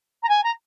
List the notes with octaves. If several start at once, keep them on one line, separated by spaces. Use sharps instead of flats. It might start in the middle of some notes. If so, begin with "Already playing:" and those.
A#5
G#5
A#5